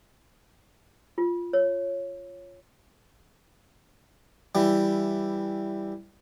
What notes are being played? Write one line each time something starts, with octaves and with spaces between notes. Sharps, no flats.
F4
C#5
E3 G3